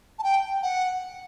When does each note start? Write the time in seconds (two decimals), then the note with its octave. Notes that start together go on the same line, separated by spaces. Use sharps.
0.19 A5
0.23 G5
0.63 F#5